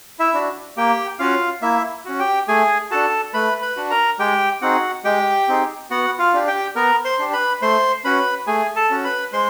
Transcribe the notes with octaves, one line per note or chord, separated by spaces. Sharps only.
E4 E5
D4 F#4
A#3 G4 G5
C#4 F4 F#4 F5
A#3 E4 E5
C#4 F#4
G4 G5
A3 G#4 G#5
D4 F#4 A4 A5
A3 B4 B5
B4 B5
D4 F#4
A#4 A#5
G#3 G4 G5
C4 D#4 F#4 G#4 F#5
G#3 G4 G5
C4 D#4 G#4
B3 F#4 F#5
F4 F5
D4 G4
G4 G5
B3 A#4 A#5
C5 C6
D4 G4
B4 B5
A3 C5 C6
C#4 F#4 B4 B5
A3 G#4 G#5
A4 A5
C#4 F#4
B4 B5
G#3 C5 C6